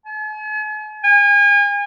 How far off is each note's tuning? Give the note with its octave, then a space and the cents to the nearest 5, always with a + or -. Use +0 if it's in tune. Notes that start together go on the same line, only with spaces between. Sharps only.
G#5 +45
G#5 -35